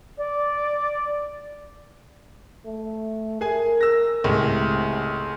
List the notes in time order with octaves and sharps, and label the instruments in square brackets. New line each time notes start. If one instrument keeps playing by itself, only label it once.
[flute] D5
[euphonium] A3
[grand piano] G#4 G#5 [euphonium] A#4
[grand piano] E6 A#6
[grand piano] C#2 A2 [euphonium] C3